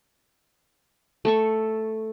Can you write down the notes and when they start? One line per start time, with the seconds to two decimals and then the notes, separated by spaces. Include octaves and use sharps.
1.25 A3 A4 C#6